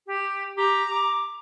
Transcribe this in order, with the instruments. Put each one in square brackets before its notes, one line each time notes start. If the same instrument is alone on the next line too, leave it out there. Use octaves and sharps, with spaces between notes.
[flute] G4
[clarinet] G4 [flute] A#5
[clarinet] D6